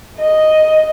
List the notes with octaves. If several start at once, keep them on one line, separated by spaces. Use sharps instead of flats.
D#5